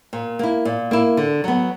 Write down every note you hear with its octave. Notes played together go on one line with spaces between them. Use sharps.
A#2
A#3 E4
A#2
A#3 E4
D3
F#3 B3